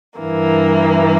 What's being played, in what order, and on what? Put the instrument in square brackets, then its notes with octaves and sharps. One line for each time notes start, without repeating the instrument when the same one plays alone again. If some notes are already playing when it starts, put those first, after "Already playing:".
[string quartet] G2 E3 A#3